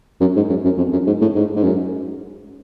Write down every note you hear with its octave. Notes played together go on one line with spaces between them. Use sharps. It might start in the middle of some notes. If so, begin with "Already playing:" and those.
F#2
G#2
F#2
F#2
F2
F#2
G#2
A2
G#2
G#2
F#2